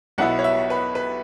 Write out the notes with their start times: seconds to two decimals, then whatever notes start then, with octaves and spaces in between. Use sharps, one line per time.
0.18 B1 B2 B3 E4 F#5
0.39 C#5
0.44 E5
0.70 B4
0.95 B4